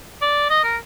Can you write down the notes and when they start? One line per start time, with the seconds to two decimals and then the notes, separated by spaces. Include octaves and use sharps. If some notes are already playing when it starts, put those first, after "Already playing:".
0.21 D5
0.50 D#5
0.64 A#4